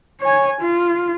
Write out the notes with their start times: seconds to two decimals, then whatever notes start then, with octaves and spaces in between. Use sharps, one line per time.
0.21 C#5 G#5
0.61 F4